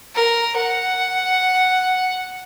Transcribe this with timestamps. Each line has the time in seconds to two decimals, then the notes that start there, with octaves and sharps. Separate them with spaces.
0.15 A#4
0.56 F#5